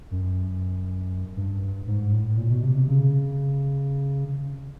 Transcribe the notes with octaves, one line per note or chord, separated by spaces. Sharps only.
F#2
G2
G#2
A2
A#2
B2
C3
C3
C#3